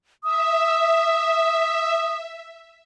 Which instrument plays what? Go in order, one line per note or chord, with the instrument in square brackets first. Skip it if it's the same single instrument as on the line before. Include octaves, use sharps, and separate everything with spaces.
[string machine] E5 [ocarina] D#6